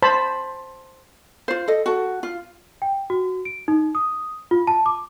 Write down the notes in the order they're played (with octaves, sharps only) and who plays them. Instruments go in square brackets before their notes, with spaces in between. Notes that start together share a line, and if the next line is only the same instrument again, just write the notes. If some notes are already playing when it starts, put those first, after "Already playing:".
[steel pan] C5 A5 B5
[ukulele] F4 C5
A4 D#5
F#4 A4
F4
[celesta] G5
F#4
D7
D#4
D#6
F4
A5
D6